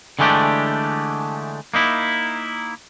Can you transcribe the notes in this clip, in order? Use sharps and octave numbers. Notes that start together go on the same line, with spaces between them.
D3 E3 G#3 A3 D4 G4
A#3 D#4 E4